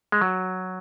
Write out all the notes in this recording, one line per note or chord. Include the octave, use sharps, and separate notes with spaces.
G#3
F#3